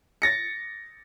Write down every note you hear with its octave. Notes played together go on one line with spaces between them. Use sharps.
A6 A#6 C#7